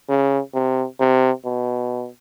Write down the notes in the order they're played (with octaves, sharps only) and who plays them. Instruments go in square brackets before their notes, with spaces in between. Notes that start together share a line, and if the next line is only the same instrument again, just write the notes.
[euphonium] C#3
C3
C3
B2